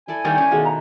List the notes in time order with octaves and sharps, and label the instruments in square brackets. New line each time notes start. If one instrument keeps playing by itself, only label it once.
[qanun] E4 A4 D5 [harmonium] G#5
[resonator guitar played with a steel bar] D#3 G3 A#3 [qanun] C#5 D5
[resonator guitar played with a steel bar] C#4 [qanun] D4 E4 C#6
[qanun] B2 D#3 A3 [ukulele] F4 G#4 F#5
[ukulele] A#5